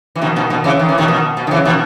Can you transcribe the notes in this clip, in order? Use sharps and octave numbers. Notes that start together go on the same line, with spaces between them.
E3
B2 D#3
B2 D#3
B2 D#3
C#3 E3
D#3
E3
B2 D#3
B2 D#3
B2
D#3
C#3 E3
B2 D#3